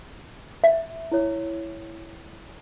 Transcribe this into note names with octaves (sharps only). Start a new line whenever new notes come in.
E5
E4 C#5